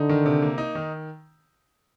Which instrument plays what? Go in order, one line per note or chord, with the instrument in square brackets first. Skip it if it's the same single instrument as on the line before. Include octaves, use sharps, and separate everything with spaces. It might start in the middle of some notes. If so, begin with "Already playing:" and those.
Already playing: [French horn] D3 [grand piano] D#4
[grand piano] D#3
C3
A#3
D#4
D#3